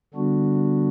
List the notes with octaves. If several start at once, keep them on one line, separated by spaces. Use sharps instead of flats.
D3 G3 B3 D4 F#4